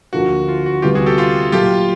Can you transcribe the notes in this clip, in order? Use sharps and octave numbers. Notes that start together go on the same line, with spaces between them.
D2 D3 F3 A#3 F#4
F4
F#4
D2 C3 E3 G3 B3 F4 G4
F#4 G#4
G4 A4
F4 G4
A#2 F#3 A3 F4 G4